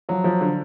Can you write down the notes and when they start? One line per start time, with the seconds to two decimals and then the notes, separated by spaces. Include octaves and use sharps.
0.09 F3 F#3
0.24 F3
0.41 D3